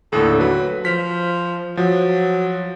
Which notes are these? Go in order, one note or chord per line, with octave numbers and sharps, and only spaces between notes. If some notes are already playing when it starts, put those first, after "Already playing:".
D#2 A2 D3 A4
F#3 B4
F3 B6
F3 F#3